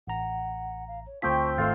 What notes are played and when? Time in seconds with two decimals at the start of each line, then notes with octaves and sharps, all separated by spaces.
0.07 A1 F#5 A#5
0.88 F5
1.06 C#5
1.22 D2 F3 A3 C4 G5 C#6 B6
1.58 G#1 A3 F4 C5 F5 E6